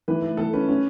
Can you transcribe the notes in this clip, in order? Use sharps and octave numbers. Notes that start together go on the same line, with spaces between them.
E3 B4
A3
E3 A4
C#4 B4
C#4